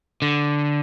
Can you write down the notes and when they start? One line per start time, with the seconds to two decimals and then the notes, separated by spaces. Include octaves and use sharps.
0.22 D3